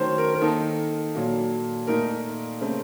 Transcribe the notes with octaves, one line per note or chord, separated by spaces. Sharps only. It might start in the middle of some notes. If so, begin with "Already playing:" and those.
Already playing: D#3 F#3 A3 C#4 C5 C#5
A#4
A#4
D#3 A#3 D#4 A4
A#2 F#3 A#3
A#2 A3 D#4 A#4
C#3 A3 C4